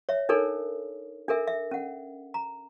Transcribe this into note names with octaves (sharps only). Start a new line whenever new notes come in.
C#5 E5
D4 D#4 A4 A#4 C#5
D4 A4 A#4 E5
E5
C#4 F#5
A#5